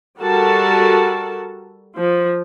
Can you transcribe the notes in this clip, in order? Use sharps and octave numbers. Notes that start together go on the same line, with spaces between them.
G3 F#4 A4 A#4 A5
F3